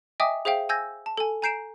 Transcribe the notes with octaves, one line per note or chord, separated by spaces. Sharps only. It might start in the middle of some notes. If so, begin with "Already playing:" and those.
D#5 E5 G5 G#5 D6 D#6
G#4 C5 E5 F5 G5
G#5 E6 G6 G#6 A#6
A5
A4 G#5
G#5 A#5 G6 C7 D7 E7